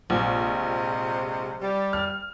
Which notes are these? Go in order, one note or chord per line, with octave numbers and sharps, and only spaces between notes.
A#1 C3 F3 G#3
G3
F6